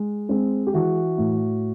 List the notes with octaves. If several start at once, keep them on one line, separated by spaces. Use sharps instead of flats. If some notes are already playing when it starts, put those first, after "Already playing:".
Already playing: G#3
G#3 C4
G4
E3 F#4
A2